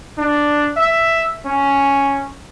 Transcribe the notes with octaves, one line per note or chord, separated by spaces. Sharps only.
D4
E5
C#4